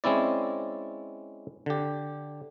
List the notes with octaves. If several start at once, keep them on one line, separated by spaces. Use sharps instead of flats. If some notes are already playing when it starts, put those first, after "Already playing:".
G#3 C4 C#4 E4 D5
D3 G4